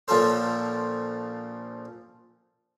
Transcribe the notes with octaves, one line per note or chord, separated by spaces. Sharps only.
A#1 A#2 F3 C#4 A4 C5